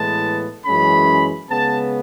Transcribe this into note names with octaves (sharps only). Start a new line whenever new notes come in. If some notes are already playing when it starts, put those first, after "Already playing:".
Already playing: A2 E3 G#3 B3 A5
F#2 E3 G#3 C#4 B5
C#3 G#3 B3 A5